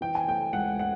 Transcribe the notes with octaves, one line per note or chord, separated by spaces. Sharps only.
E3 G5
G#5
A3 G5
C#2 F#5
A3 F#5